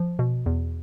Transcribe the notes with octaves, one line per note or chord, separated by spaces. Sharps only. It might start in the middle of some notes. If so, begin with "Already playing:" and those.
Already playing: F3
B2
E2